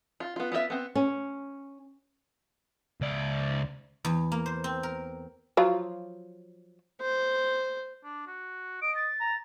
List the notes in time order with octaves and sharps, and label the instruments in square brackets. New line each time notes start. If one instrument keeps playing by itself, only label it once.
[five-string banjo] F4
B3 F4
B3 F4 F#4 E5
B3 C4
[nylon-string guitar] C#4
[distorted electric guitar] C#2 D5
[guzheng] E2
A#3
C5
C4
A#4
[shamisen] F3 F#3 F4
[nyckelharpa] C5
[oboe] D4
F#4
[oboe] D#5 [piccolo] D7
[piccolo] A6
[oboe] A#5